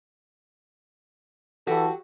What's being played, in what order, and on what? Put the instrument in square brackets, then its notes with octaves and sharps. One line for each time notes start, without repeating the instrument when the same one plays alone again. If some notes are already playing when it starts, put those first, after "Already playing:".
[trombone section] E3 A4 [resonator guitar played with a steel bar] F#3 F#4 G4